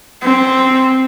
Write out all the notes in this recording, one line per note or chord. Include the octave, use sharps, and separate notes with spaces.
C4